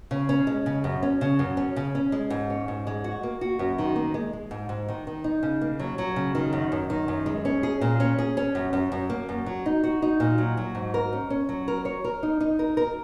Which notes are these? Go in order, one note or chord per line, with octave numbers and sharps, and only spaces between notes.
C#3
C#4
G#3
C#3
F#2
C#4
C#3
F#2
C#4
C#3
C#4
G#3
G#2
C#4
G#2
G#3
F#4
A#3
F#4
F#2
D#3
A#3
G#3
G#3
G#2
G#2
D#3
D#3
D#4
C#3
A#3
F#3
F#3
C#3
D#3
F#2
F#2
D#3
F#2
G#3
C#4
G#4
A#2
C#4
G#4
C#4
F#2
F#2
F#2
A#3
F#2
F#3
D#4
F#4
D#4
A#2
F#3
F#3
G#2
A#4
C#4
C#4
F#3
A#4
C#5
A#4
D#4
D#4
A#4
A#4